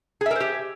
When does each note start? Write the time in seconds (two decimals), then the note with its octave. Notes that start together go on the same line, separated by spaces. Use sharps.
0.21 G#4
0.26 E5
0.31 A#4
0.36 C5
0.40 G4